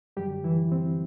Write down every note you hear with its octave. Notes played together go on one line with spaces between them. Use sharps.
F#2 D3 F#3 G3 G4
E3 E4
C4